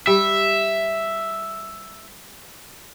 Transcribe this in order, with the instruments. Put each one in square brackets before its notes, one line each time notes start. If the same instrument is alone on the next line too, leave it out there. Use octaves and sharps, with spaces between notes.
[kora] G3 [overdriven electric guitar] E5